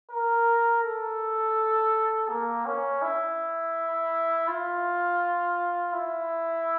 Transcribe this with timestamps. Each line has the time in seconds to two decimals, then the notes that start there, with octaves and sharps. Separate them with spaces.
0.11 A#4
0.83 A4
2.29 A#3
2.66 C#4
3.02 E4
4.48 F4
5.93 E4